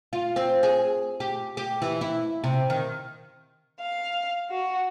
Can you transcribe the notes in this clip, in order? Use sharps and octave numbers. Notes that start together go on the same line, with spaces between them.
F4
C4
G#4
G4
G4
E3
E4
C3
D#3
F5
F#4